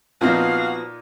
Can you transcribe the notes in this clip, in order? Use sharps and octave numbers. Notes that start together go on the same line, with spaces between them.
A#2 F3 B3 C4 D#4 F#4 F5